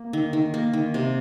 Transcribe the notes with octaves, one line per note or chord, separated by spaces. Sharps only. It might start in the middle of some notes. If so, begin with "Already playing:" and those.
Already playing: A#3
D#3
D#3
A#3
D#3
C3